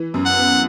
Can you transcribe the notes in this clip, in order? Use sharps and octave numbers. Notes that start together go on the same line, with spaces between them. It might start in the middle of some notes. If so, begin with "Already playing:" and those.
Already playing: E3
F#2
F#5
B3